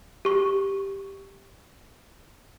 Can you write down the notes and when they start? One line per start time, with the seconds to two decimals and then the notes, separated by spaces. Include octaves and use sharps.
0.25 G4 C#6